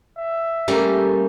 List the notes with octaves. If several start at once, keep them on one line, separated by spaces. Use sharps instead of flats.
E5
G3 A3 A#3 C#4 A#4